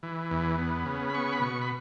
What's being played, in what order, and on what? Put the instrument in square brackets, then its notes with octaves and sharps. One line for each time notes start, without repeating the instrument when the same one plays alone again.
[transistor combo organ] E3
E2
B3
C#3
B5
B3 C#6
B5
B2 C#6
B5